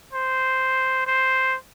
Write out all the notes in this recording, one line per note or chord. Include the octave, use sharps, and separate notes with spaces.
C5
C5